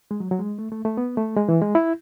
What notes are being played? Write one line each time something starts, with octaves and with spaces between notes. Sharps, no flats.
G#3
F#3
F#3
G#3
A3
A3
A3
B3
A3
G#3
E3
G#3
E4